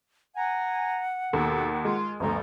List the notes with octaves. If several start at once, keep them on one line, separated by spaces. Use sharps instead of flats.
F#5 G#5 A#5
D#2 B2 B3 A4
G#3 F4
G1 D2 F3 G3 A#5